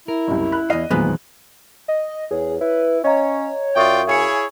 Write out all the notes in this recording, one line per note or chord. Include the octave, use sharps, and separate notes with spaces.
E4 A#4
F#1 C2
B5 F#6
E2 D#5 F5
E2 A#2 D#3 F#3 G#3 B3 C4 F#6
D#5
E2 G#4 C#5
E4 B4
C#4 C#5 D#5 F5 A#5
F#2 F4 D5 E5 G5 C#6 D#6
E4 G#4 C#5 F5 G#5 C#7